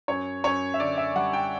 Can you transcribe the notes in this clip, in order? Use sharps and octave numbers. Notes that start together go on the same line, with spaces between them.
F#2 C#5
F#2 C#5
E5
D3 D5
E5
G3 F#5
G5